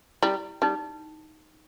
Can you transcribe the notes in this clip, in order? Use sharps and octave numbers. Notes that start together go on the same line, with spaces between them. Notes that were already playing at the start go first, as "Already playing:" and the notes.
G3 E4
G3 D#4